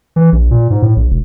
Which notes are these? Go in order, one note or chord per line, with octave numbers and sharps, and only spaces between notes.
E3
A#1
A#2
G#2
A2
A#1
E1